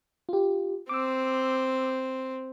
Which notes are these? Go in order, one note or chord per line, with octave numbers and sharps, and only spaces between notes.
F4 G4
C4 D6 E6